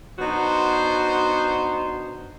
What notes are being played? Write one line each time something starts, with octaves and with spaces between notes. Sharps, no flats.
B3 D4 D#4 F#4 C5